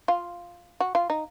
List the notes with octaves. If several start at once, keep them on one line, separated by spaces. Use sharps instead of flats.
F4
F#4
F4
D#4